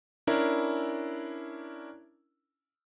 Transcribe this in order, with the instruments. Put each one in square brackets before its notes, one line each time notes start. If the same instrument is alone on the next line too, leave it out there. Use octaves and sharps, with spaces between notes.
[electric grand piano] C#4 D4 E4 A#4